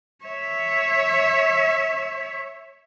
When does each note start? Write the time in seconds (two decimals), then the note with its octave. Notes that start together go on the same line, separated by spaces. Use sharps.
0.25 C#5 E5